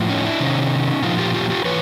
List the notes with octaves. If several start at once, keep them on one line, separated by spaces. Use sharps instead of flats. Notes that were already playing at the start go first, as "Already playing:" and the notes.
Already playing: A2 F3
C#4 D#4
D4 E4
C3 D#3 C#4 D#4
A#2 F3 D#4 F4
F4 G4
F4 G4
F4 G4
E3 B4 C#5